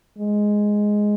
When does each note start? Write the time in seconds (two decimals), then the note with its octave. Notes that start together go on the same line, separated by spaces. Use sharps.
0.18 G#3